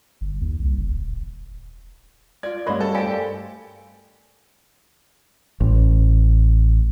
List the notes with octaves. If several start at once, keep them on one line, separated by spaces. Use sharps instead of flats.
G1
D#2
C2
F#1
D#1
F4 D5 G#6
G2 A3 A#4 C#5 D#5 B5 C6
A4
G4 C5 D5 F5 G#5
A1